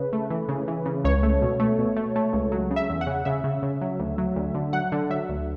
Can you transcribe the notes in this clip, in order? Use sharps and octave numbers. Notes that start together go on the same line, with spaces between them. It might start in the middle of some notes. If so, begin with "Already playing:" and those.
Already playing: C#3 B4
A3
E3
C#3
E3
C#3
C#2 C#5
A3
B2
A3
B2
A3
A3
C#2
F#3
C#3
E5
E2
F#5
C#3
C#3 E5
C#3
C#3
F#3
D2
F#3
D2
D3
F#3 F#5
D3
F#3 E5
D2